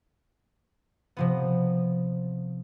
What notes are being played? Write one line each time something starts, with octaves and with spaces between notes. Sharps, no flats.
C3 F3 B3